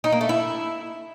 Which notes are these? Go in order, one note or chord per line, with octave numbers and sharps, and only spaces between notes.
D#4
A#3
A3
E4